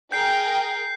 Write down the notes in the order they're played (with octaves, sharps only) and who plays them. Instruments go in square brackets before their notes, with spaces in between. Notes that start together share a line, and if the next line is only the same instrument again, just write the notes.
[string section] G#4 A#4 G5 [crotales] G6 C7